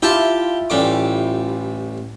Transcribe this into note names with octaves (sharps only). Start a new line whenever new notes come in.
E4 F4 G4 E5 G5 A5
A1 G3 D6